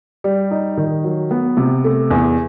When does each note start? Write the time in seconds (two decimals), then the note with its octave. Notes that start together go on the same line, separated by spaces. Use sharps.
0.24 G3
0.51 D#4
0.77 D#3
1.04 F#3
1.31 B3
1.57 C3
1.84 A3
2.10 E2